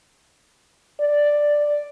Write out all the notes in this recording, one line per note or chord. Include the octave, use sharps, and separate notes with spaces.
D5